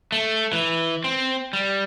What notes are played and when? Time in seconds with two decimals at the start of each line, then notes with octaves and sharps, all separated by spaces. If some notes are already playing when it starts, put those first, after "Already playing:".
0.12 A3
0.53 E3
1.04 C4
1.53 G3